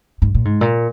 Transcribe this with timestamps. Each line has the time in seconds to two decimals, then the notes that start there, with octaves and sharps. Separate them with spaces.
0.22 G#2
0.35 A#2
0.45 G#2
0.61 A#2